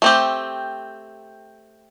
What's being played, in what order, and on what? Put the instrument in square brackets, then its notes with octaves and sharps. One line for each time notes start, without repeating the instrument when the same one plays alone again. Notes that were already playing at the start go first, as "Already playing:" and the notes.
[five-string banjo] A3 C4 G4